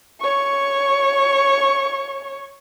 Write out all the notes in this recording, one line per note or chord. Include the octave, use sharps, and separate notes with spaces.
C#5 C#6